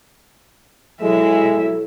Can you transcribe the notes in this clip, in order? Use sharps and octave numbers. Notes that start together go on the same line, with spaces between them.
B2 F#3 G#3 E4 A4 E5